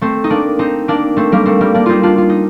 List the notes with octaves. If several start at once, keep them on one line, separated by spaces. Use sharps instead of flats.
A3 C4
D#4
A#3 D4
C4 D#4
A#3 D4
A3 C4
G3 A#3
A3 C4
G3 A#3
A#3 D4
C4 D#4 F4
D4 F4
F4
D#4